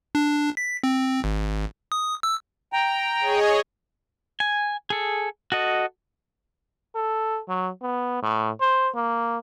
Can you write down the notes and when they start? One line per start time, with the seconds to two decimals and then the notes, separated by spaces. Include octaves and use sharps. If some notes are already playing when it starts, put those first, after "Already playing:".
0.15 D4
0.57 B6
0.83 C4
1.24 G#1
1.92 D#6
2.23 E6
2.73 G5 A#5
3.19 G#4 C#5 D#5
4.40 G#5
4.90 G#4 A4
5.52 F#4 A4 D#5
6.95 A4
7.48 F#3
7.82 B3
8.22 A2
8.61 C5
8.95 A#3